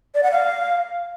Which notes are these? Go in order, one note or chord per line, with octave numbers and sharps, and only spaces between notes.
D5
F#5
F5